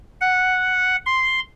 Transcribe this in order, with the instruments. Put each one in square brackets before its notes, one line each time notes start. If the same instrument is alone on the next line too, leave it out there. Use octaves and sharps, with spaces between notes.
[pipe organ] F#5
C6